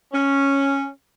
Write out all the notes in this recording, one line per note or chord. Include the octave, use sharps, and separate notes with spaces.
C#4